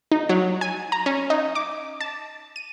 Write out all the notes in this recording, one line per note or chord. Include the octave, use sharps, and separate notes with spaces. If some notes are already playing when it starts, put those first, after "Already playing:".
D#4
F#3
G#5
A#5
C#4
D#4
D6
A5
D#7